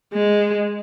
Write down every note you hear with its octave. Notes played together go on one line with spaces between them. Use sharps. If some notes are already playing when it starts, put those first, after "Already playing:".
G#3